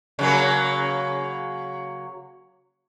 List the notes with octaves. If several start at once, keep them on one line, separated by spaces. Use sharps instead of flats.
C#3 F#3 A#3